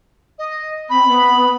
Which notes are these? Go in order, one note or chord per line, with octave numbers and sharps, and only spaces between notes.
D#5
C4 B5
B3